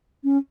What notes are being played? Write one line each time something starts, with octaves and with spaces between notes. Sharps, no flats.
C#4